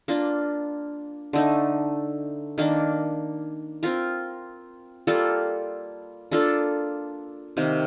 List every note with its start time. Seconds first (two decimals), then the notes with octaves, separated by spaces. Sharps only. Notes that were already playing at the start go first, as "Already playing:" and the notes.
0.08 A#3 D4 F4
1.33 D3 A3 D#4
2.58 D#3 A#3 D4
3.83 C4 F4 A#4
5.07 G3 A#3 F4 A4
6.31 A#3 D4 F4 A4
7.57 C3 D#3 A#3